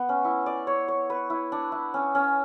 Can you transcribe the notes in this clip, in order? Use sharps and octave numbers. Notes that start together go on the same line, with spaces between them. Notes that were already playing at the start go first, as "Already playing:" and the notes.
Already playing: B3
C#4
E4
D5
C#5
C#5
B4
E4
D4
E4
C#4
C#4